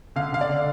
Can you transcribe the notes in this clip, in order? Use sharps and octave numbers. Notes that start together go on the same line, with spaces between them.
D3 F5
D3 F5
D5
D3